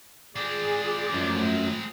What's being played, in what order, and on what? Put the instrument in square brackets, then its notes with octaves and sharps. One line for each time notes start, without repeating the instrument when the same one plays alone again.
[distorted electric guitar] G#3 C4 [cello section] F4 G#4 [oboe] D5
[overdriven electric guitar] F#2 [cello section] F3 A3